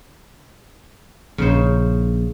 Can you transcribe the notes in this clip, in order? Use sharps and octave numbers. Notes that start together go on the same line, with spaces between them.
A#1 C#3 D#4 C5